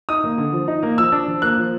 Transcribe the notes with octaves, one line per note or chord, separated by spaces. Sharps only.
D#4 D#6
A#3
D3
F3
D#4
A#3
F3 E6
D4
F3
A#3 F#6
F3